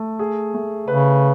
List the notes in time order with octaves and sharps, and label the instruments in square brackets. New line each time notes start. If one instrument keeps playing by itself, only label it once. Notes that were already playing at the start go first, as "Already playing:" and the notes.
Already playing: [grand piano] A3
G#4
A3
[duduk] C#3 [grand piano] B4